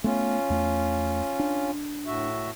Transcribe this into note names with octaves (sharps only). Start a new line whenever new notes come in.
A3 B3 C#4 F4
E2 A3
D4
A2 F#4 E5